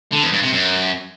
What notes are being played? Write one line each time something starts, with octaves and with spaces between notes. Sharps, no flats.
D3
E2
G2
C3
F#2